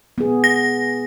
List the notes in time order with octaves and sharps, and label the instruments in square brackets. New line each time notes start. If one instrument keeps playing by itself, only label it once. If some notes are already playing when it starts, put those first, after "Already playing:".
[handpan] B3 G#4
[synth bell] A#6